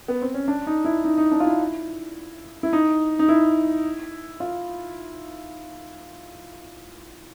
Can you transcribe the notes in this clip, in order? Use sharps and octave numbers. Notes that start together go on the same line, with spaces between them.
B3
C4
C#4
D4
D#4
E4
D#4
D#4
D4
F4
E4
E4
D#4
D#4
E4
F4